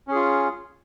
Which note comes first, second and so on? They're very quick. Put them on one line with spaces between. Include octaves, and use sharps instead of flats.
C#4 G#4 F4